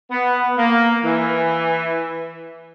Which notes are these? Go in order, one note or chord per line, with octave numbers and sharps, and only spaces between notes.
B3
A#3
E3